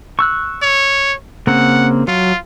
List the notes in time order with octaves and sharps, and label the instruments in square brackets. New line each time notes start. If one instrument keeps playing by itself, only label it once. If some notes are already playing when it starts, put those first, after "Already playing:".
[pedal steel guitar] C#6 E6 F#6
[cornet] C#5
[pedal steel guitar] C#3 A#3 C4 [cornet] F#5
[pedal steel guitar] F#3 [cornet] F4